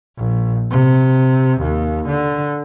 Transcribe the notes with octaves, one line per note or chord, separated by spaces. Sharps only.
A#1
C3
D#2
D3